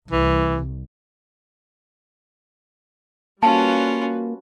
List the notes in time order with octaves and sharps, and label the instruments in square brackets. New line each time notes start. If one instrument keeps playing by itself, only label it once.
[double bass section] C2 [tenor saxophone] E3
[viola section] G3 F#4 B4 [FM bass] A#3 [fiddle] C#4 F4 [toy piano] A5